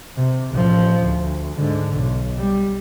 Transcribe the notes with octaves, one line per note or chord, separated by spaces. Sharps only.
C3
A1 F3
D2
G#2 D3
B1
G3